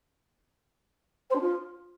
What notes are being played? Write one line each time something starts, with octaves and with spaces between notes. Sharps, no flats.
C5
D4
F4